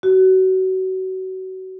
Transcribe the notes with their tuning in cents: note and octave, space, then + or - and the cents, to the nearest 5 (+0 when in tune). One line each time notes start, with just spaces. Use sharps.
F#4 +25